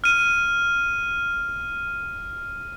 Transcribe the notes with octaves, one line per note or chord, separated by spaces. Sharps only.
F6 D#7